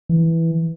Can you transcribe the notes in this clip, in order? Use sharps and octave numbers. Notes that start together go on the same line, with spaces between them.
E3